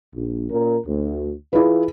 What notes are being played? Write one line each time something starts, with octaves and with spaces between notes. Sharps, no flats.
A#1
A#2 C#4 A#4
D2
E3 E4 F4 G#4 B4